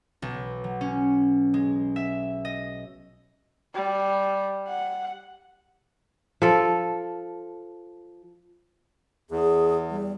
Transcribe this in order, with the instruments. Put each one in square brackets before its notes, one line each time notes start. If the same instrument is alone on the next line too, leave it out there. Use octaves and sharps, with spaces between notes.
[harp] B1
F#3
C#4
G#3
E5
D#5
[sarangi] G3
F#5
[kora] F3 A4
[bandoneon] E2 [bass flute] G#4
[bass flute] G3